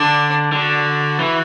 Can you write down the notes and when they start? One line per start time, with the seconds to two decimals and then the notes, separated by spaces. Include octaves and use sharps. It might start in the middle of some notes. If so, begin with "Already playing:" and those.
Already playing: D3 D4
0.52 D3 F#4
1.20 E3